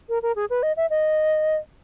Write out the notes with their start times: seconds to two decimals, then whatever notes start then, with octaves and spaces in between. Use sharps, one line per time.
0.09 A#4
0.23 A#4
0.36 G#4
0.50 B4
0.63 D#5
0.77 E5
0.90 D#5